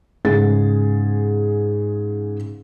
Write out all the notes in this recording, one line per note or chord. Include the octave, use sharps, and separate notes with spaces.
G#2 C#3 G#4 A6